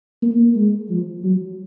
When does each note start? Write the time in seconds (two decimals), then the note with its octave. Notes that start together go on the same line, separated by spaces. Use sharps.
0.22 A#3
0.55 G#3
0.90 F3
1.23 F#3